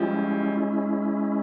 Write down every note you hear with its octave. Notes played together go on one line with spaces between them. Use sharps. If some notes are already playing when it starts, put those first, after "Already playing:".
Already playing: F3 G3 G#3 C#4 E4